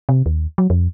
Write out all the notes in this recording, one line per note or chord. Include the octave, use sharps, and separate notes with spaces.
C3
D#2
F#3
F2